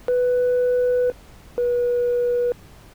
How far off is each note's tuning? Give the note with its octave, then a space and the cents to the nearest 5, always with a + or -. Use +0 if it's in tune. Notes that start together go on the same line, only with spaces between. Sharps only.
B4 +5
B4 -30